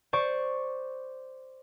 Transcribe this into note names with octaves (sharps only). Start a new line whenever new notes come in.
C5 D5 C#6